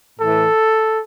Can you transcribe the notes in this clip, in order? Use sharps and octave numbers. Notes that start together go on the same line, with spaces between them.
A2 E3 A4